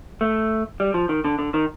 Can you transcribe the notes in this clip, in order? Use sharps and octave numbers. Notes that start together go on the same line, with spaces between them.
A3
G3
F3
D#3
D3
D3
D#3